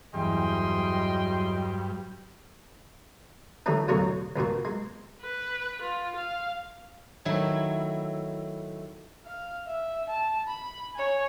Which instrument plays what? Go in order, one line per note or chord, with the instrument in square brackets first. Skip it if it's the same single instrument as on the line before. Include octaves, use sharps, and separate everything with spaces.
[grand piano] E2 E3 [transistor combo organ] G2 [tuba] F#3 [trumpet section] D#5 G5 C6
[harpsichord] D3 E3 G3 A3 C#4
A1 E2 B2 D3 F#3 C#5
C2 G2 A#2 F#4
G#3
[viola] B4
F4
F5
[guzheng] D#3 F#3 A3 E4
[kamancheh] F5
E5
A5
B5
C#5 G#5